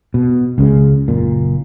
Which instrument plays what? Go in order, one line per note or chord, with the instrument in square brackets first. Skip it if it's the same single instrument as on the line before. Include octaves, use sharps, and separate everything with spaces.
[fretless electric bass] B2
C#2 C#3 G#3
F#1 A#2